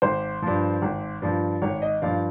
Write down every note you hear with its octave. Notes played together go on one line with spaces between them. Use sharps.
G#1 C5
G2 F3
G#1
G2 F3
G#1 C#5
D#5
G2 F3 F5